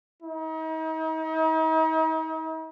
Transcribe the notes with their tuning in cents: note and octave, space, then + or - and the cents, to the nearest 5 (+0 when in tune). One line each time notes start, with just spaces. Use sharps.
D#4 +40